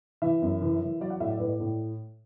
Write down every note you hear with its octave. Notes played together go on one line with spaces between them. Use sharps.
E3 E5
F#2
E3
E3
F#3 D5
F#5
A2 E5
D5
A2 B4
D5
A2